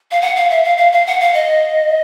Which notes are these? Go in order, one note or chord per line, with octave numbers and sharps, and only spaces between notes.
F5
F#5
F5
E5
F5
F5
F5
F#5
F5
D#5